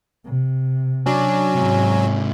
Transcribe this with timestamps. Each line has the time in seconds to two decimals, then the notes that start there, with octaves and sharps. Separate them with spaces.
0.25 C3
1.06 F#3 C#4 D4
1.55 G#2 C3 G#3